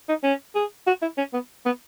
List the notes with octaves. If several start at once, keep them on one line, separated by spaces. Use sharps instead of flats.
D#4
C#4
G#4
F#4
E4
C#4
B3
B3